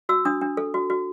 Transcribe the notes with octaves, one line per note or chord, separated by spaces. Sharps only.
F#4 E6
D4 D#6
D4
A4
F#4
F#4